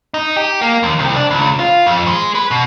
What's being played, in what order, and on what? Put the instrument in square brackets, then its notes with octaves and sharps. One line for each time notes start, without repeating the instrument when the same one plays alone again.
[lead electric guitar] D#4
G4
A#3
D#2
C2
D4
C#2
F4
F2
G#3
B4
B2